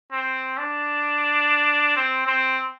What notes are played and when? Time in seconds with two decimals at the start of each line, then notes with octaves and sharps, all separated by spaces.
0.12 C4
0.58 D4
1.96 C4
2.26 C4